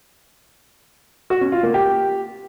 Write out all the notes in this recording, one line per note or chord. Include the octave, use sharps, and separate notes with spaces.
F#4
C#4
F4
A#3
G4